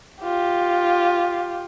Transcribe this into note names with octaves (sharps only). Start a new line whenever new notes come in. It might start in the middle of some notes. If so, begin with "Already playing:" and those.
F4 G4